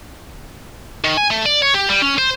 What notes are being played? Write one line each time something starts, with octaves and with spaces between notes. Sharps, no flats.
D#3
G#5
A3
D5
C#5
G4
G3
C#4
C5